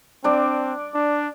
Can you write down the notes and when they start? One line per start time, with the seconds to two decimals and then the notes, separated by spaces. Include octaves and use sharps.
0.24 C4 D4 D5
0.95 D4